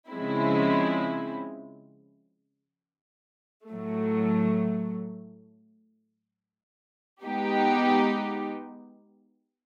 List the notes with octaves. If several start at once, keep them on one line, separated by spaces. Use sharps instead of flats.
C#3 F3 G#3 C4 E4
A2 F#3 A3
G#3 B3 D#4 G4